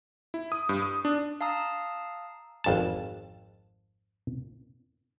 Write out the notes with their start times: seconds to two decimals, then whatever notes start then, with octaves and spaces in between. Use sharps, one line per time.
0.34 E4
0.52 D#6
0.69 G2
0.82 D#6
1.05 D4
1.41 F5 A5 A#5 D#6 E6
2.64 G#1 F2 A5